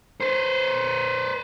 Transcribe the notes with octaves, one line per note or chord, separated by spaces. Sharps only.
B4 C5